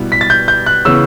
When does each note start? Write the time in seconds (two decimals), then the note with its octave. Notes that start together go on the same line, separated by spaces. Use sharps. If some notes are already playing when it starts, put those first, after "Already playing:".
Already playing: B2 G3 B3 E4
0.12 B6
0.21 A6
0.30 G6
0.48 G6
0.66 F#6
0.85 C#3 E3 B3 E6